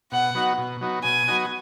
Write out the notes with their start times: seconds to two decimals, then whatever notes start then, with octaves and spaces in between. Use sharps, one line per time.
0.12 B2 F#5
0.35 F#3 B3 D#4 F#4
0.58 B2
0.81 F#3 B3 D#4 F#4
1.03 B2 G#5
1.28 F#3 B3 D#4 F#4